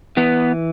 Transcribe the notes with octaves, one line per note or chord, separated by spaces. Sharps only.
E3 B3